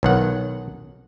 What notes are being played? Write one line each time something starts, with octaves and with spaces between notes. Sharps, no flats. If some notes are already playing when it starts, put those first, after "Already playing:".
B1 D#3 F#5